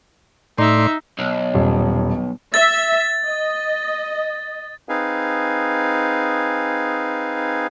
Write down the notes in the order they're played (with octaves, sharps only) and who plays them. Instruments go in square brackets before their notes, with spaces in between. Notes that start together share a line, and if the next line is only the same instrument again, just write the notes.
[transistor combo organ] A2 D5 C6 [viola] D#4 E5
[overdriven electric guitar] B1
[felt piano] D#1
[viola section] E5 [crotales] A6
[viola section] D#5
[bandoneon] C4 D#4 G#4 B4 F5 G#5